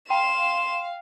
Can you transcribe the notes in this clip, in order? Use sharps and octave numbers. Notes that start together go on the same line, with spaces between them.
F5 G5 C6 E7